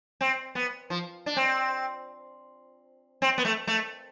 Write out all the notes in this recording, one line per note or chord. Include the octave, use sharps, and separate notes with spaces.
C4
B3
F3
D4
C4
C4
B3
A3
A3